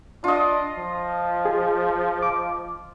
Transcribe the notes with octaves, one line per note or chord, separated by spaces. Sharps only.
D4 F4 D#5
F3
G#4
D6